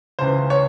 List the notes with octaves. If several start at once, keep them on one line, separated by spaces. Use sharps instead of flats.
C#2 C#3 E3 C5
C#5